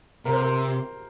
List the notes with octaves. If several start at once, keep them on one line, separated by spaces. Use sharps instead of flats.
C3 A#4
C5
A#4